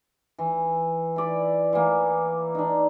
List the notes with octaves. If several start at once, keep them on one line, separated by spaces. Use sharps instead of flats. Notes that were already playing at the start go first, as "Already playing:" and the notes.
E3
E4 D5
E3 A#3
D4 D#4